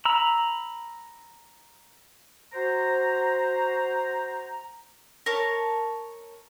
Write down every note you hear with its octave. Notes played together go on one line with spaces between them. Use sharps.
A#5 B5 E6
F#4 C5 A#5
A#4 C#5 A5